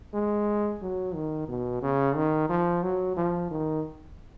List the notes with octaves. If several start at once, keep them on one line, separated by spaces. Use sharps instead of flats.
G#3
F#3
D#3
B2
C#3
D#3
F3
F#3
F3
D#3